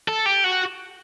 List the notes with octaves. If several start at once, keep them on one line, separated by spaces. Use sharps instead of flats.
A4
G4
F#4